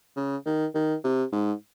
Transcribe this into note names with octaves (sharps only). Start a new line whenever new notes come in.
C#3
D#3
D#3
C3
G#2